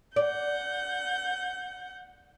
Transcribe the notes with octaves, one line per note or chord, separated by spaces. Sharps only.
D5 F#5 G6